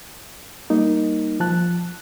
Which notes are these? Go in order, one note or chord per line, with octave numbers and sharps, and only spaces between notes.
G3 A#3 D#4
F3 A5 F#6